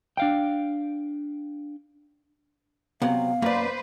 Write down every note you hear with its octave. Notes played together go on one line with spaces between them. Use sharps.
D4 F5 G5
C3 F#3 B3 F5
F#2 A#3 B4 C5 D5